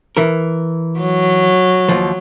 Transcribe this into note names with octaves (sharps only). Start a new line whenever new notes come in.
E3 A#4
F#3
D#2 F3